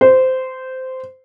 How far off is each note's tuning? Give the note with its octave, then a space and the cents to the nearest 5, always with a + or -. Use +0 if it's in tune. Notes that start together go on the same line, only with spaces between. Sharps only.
C5 -15